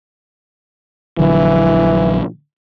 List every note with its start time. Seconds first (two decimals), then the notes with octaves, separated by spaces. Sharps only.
1.19 A#1 D3 E3 F#3